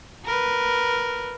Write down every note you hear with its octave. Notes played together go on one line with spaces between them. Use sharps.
A#4 B4